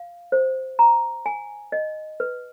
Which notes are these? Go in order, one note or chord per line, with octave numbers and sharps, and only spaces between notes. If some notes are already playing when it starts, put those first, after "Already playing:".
Already playing: F5
C5
A#5
G#5
D#5
B4